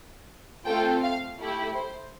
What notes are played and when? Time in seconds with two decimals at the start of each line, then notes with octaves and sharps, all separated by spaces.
0.65 A3 C4 F4 A4 G5
1.02 F5
1.39 A3 E4 G4
1.75 C5